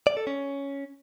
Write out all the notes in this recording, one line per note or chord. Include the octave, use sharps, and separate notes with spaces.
D5
A4
C#4